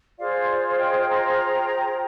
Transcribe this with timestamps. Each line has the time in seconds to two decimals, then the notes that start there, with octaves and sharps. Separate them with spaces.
0.18 F4 G#4 C5 D5 F5
0.48 D5 F5
0.78 D#5 G5
1.08 G5 A#5